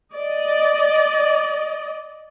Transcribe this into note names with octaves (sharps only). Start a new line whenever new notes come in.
D5 D#5